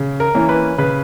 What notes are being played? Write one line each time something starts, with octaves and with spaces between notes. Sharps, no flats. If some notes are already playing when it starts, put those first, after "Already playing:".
Already playing: C#3
A#4
E3 A#3 C#4
B4
C#3 B4